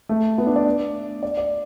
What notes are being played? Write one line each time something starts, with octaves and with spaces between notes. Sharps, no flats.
A3
B3
D4
D5
D5
D5